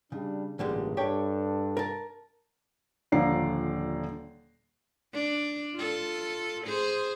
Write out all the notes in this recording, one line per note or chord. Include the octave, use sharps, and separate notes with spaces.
C#3 G3 D4
A1 G2 A#2 D3 G3 G#3
G2 D4 G4 A4 C#5 G5
A#4 A5
D#1 D3 F3 D5 A#5 C7
D4
F4 A4
G#4 C5